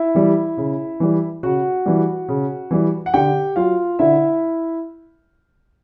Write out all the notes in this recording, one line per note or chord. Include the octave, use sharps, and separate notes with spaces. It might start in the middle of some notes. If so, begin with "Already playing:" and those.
Already playing: E4 E5
E3 G3
C#3
E3 G3
C#3 F#4 F#5
E3 G3
C#3
E3 G3
F#5
D3 G4 G5
F#3 F4 F5
D3 E4 E5